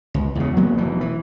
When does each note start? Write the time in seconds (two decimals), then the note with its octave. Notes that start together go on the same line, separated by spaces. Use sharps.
0.14 C#2
0.35 E2 C#3
0.57 F#3 A#3 B3
0.78 F1 B2 E3
1.01 E3